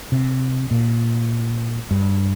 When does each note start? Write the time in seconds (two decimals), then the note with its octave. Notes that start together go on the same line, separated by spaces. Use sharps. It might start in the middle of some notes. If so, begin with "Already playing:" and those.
0.12 C3
0.71 A#2
1.91 G2